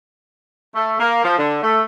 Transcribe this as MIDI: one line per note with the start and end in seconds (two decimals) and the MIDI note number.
0.75 0.95 57
1.00 1.23 58
1.24 1.36 53
1.38 1.58 50
1.63 1.82 57